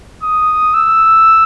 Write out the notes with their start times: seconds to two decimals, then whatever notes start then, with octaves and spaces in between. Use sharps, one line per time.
0.23 D#6
0.74 E6